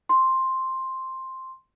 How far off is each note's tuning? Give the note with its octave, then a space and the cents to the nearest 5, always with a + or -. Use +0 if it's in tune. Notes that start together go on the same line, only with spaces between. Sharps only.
C6 +5